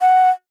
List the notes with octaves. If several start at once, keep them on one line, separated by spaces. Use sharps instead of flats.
F#5